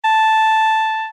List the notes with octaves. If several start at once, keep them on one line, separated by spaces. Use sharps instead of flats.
A5